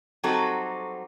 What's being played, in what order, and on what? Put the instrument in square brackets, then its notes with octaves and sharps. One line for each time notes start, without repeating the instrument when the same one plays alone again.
[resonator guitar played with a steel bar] F#3 G3 C4 D#4 F#4 A4